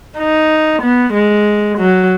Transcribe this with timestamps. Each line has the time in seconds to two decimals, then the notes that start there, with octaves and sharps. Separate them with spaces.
0.18 D#4
0.82 B3
1.14 G#3
1.78 F#3